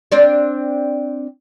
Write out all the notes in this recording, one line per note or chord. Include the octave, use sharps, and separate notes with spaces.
C4 D4 D5